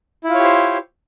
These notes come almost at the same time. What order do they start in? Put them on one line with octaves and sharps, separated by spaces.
E4 F4 C#5 G4 C5